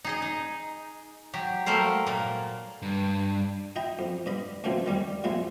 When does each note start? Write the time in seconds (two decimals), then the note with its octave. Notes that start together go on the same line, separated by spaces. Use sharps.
0.05 D#4 G#4 D#5
0.22 D#4
1.34 F#3 G4
1.66 F#3 G3 A3 A#3 A#4 C5
2.07 A#2 A#3
2.82 G2
3.76 D#4 E4 D#5 G5
3.99 F2
4.26 G2 D#5 B5
4.64 C#2 G#2 B2 F3 A3 C4
4.86 D#3 G3 C#4
5.24 A2 C3 F3 G#3 E4